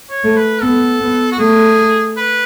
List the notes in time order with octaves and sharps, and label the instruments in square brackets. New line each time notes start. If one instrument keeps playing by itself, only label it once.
[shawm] C#5
[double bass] A3
[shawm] B4
[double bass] B3 [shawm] A4
[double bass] B3
[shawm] F#4
[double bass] A3 [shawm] G#4
[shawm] B4